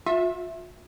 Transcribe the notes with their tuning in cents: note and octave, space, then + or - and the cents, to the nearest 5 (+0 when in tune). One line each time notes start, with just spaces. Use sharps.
F4 +40 E5 +0